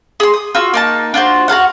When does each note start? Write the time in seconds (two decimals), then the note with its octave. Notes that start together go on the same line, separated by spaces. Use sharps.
0.20 G#4 C6
0.34 D#6
0.55 F4 F#4 E6
0.74 A#3 D#4 A5
1.14 D4 F4 F#4 C5
1.48 F#4 A4 F5 F#5